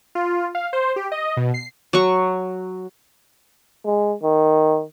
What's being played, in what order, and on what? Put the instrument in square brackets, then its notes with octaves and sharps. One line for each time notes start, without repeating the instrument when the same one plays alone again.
[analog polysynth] F4
F5
C5
G4
D#5
B2
C7
[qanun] F#3 C#6
[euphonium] G#3
D#3